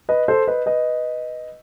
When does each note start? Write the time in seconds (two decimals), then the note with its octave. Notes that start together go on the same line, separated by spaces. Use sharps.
0.09 B4 D#5
0.28 A4 C5
0.48 B4 D#5
0.66 B4 D#5